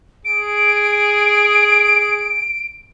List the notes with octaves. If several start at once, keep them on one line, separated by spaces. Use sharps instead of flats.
G#4 D7